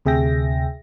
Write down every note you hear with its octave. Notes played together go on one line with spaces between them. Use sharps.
D2 C3 G#4 E5 G5 A#6